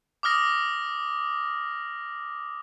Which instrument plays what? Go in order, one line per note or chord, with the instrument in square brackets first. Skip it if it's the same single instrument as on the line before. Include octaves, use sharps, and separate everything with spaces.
[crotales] D6 D#6 F6 A#6